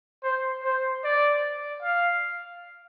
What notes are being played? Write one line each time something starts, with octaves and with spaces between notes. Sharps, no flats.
C5
C5
D5
F5